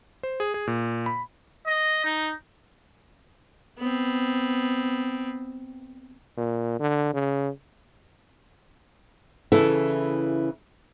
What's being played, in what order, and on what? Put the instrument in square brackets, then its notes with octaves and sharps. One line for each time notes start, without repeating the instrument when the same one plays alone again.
[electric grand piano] C5
G#4
G#4
A#2
B5
[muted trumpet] D#5
D#4
[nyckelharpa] B3 C4
[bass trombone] A#2
D3
C#3
[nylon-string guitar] C#3 E3 E4 A4